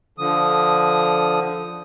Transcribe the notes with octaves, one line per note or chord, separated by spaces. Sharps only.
D3 F3 D#6